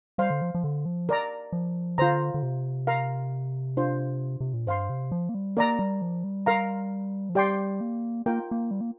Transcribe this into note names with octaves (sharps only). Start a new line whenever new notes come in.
G3 C5 F5 C6
D3
F3
F3
D3
F3
A#4 D5 A#5
F3
D3 F4 C5 A#5
D3
C3
A#4 F5 A#5
D4 F4 C5
C3
A#2
G2 C5 F5 C6
C3
F3
A#3
G3
A#3 A#4 D5 A#5
G3
F3
G3
A#4 F5 A#5
F3
G3 G4 D5 G5 C6
A#3
A#3 F4 A#4 G5
A#3
G3
A#3